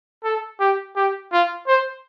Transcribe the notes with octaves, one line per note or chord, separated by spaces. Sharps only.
A4
G4
G4
F4
C5